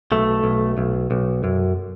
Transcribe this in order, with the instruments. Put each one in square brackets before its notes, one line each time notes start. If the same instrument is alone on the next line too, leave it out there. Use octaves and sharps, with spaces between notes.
[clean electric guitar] B1 A3
B1
B1
B1
F#2